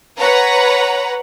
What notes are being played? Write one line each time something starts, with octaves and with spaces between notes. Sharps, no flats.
B4 C#5 F#5 A#5